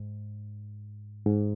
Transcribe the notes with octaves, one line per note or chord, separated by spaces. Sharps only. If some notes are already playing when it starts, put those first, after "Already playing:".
Already playing: G#2
G#2